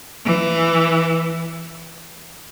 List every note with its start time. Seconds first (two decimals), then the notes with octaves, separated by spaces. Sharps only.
0.25 E3